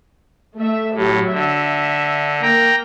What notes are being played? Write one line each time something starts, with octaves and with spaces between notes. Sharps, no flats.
A3 E5
A2 F#3 G4
D3 E5
A#3 G5 A#5